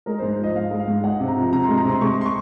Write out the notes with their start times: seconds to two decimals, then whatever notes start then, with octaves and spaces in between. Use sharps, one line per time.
0.06 G#3 A#4
0.19 C5
0.22 G#2
0.31 C5
0.39 F3 D#5
0.55 G#2 F5
0.71 G#3
0.80 F5
0.88 G#2
1.04 G#3 F#5
1.20 C3
1.28 A#5
1.36 F3
1.53 C3 A#5
1.65 G#3 C6
1.77 A#5
1.85 C3 C6
2.01 G#3 C#6
2.21 C6
2.26 C#6